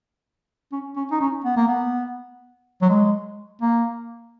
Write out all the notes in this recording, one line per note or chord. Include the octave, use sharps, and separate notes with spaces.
C#4
C#4
D#4
C#4
B3
A#3
B3
F#3
G#3
A#3